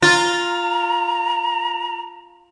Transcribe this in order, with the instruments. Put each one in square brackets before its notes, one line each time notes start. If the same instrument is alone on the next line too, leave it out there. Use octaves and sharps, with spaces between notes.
[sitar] F4 [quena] A#5